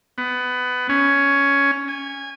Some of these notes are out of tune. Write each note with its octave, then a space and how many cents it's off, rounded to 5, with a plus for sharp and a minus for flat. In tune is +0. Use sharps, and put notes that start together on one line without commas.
B3 +20
C#4 +10
G#5 -20